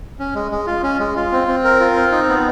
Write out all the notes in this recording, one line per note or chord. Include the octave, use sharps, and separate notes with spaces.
C#4
G#3
G#3
F4
C#4
G#3
F4
C4
C4
A#4
F4
C4
D#4
B3